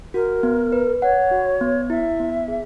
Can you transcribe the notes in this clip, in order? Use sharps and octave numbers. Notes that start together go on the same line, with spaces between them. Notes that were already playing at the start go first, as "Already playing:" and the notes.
F#4 A#4
B3
B4
C#5 F#5
F#4
B3
E4 E5
B3
G#4